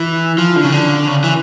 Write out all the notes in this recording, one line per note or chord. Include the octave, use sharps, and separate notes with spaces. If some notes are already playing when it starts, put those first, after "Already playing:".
Already playing: E3
F3
D3
C#3
D3
C#3
E3